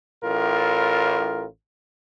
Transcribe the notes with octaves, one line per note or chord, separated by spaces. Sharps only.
A1 A2 F4 A#4